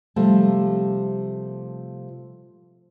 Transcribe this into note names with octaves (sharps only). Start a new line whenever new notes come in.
C3 F3 G3 A3